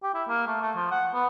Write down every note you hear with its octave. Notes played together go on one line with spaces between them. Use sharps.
G4
E4
A#3
A3
A3
F3
F#5
B3